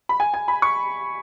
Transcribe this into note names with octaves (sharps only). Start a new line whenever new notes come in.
B5
G#5
G#5
B5
C#6